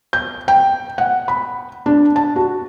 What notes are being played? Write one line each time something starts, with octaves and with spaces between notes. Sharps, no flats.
G6
G5
F#5
B5
D4
A5
F#4